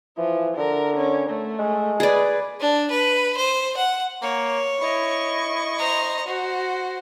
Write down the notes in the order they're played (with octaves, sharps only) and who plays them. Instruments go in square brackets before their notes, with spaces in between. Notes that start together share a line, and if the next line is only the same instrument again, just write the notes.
[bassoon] E3 [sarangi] F3
[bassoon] D3 [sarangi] A#4
[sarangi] C#4
A3
[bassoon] G#3
[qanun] G#4 D5 [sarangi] B4
[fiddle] D4
B4
C5
F#5
[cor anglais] A#3 [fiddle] C#5
[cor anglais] E4 [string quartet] D#5 C#6
[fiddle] C5 A#5
[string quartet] F#4 [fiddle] C5